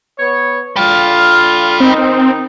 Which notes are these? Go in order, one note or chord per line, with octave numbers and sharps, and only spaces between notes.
B3 C#5
D3 F4 G5 B5
D#3 C4 D#4